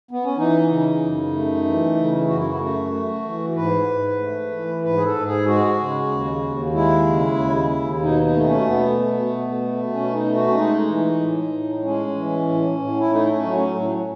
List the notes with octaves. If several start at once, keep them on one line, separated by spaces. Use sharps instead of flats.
B3
C#4
E3 D#4
C#3
F#2
A3
E3
C#3
F#2 F#4
E4
F#4
A3
A3
E3
G#2 B4
G#2
A3
E3
G#2 B4
G#4
A4
G#2
G#4
G#3 F#4
C#3
D#2
D#2
G#3 E4
C#3
D#2
D#2
B2 D#4
D#4
A3
B3
C#4
B2 B3
A3
B2
A3
B2 C#4
D#4
A3
F#4
C#4
G#3 D#4
E3
A2
A2
G#3 C#4
E3
A2
A2
E4
A3 D#4
C#4
F#3
C#4
A2